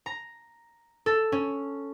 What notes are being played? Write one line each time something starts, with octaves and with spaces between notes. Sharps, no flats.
A#5
A4
C#4